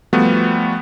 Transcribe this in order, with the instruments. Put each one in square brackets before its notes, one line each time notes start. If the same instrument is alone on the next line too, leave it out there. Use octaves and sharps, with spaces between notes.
[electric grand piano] F3 G3 A3 B3 F#4